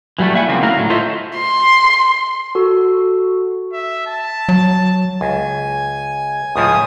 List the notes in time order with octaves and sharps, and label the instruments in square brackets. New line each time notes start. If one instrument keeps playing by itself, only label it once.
[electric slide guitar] E3 F#3 G3 A3 F#4
A#3 E4 E5 F#5 G#5
C#3 F3 A#3 C4
D3 A3 E4 F#4 F5 A#5
A2 F#3
F4 A4 C5 C#5 D#5 E5
[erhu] C6
[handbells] F#4 A4
[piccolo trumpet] E5
A5
[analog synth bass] F#3
[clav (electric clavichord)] C#2 [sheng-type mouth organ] G#5
[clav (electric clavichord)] C#2 A2 F3 [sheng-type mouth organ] G#5 D#6